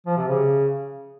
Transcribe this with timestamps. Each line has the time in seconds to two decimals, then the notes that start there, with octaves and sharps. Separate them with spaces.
0.07 F3
0.17 C3
0.28 C#3